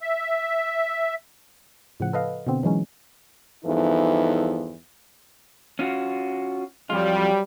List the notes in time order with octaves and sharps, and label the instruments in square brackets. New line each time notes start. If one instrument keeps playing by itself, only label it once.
[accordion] E5
[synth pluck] A2 C#3 F3 F#5
A4 B4 D#5 F5
B2 D3 B3 C4
E3 F#3 G#3 C#4 D#4
[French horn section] E2 G2 E3 F3 D#4 A4
[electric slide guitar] C#4 F4 F#4
[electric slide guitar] F2 F4 [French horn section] F#3 G3